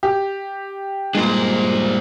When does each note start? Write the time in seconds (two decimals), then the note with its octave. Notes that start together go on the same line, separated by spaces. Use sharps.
0.03 G4
1.15 G2 A#2 G#3 D4 C5